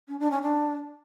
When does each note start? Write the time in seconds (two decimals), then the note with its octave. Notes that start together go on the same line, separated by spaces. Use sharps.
0.08 C#4
0.20 D4
0.31 C#4
0.42 D4